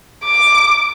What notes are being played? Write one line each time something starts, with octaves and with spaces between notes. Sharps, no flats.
D6